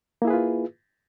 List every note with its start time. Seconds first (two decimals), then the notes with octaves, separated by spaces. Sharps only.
0.22 A#3
0.25 E4
0.27 G#4
0.30 B4
0.33 F4